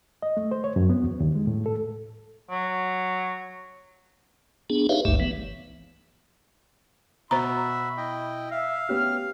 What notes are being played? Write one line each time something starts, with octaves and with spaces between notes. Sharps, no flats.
D#5
A3
C5
C#5
F#2
B3
E2
D#2
G#3
A2
A4
F#3
B3 D4 G#4
D#4 G4 B4 C#5 E5 F5
G1 C#2 G2 A3 E5
E3 B3
B2 F#4 C5 E5 A#5 B5
E4 D#5 G5
E5 F5
B3 C#4 G4 F6